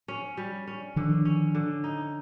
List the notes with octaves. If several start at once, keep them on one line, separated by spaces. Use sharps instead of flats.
C#4
G3
C#4
D3 D#3 F3
C#4
D3
D#4